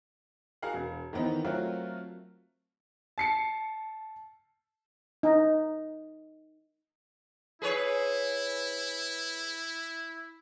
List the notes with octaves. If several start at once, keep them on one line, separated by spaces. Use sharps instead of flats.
F#4 G#4 A#4 F5 F#5
E1
D#3 E3 B3 C4 D#4
F#3 A3 C4 F4 F#4 A#4
A5 C7 C#7
D#4
E4 G#4 B4 C#5